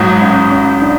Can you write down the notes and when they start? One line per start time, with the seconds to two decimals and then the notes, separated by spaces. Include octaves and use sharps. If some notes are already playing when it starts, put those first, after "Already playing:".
Already playing: A1 G#2 F#3
0.22 C#4
0.51 C#4
0.82 D4